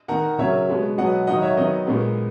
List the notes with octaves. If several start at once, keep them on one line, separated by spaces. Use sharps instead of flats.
D#3 A#3 F#5 A#5
C#3 F#3 A#3 C#5 E5
B2 G#3 B3
B2 F#3 B3 D#5 F#5
D#3 F#3 A#3 D#5 F#5
C#5 E5
D#3 F#3 B3 D#5
A#2 G#3 B3